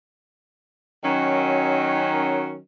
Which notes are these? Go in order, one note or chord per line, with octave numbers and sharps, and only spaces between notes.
D#3 F#3 C#4